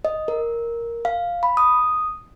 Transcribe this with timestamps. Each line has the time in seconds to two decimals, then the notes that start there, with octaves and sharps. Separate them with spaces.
0.05 D#5
0.28 A#4
1.05 F5
1.43 B5
1.57 D#6